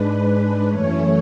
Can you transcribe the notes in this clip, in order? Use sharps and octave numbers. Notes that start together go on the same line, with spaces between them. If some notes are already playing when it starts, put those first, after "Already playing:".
Already playing: G#2 G#3 D4 B4
F#2 E3 A3 C#4 C#5